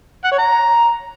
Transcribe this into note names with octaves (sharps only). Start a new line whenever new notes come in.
F#5
C#5
A#5